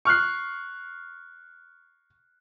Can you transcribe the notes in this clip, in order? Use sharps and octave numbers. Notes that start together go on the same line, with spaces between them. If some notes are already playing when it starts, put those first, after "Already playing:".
C#6 F6 F#6 C7